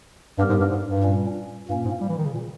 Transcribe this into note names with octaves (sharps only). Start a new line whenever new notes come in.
G2 G3 B3 G4 A#4
G#2
G2
G#2
G2
A#2 G3 C#4
G2 A#2 A#3 C#4
G#2
G3
E3
D#3
C#3
A#2